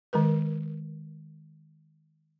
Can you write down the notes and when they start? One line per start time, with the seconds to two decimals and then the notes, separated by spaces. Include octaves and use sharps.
0.13 D#3 G#3 A#4 B4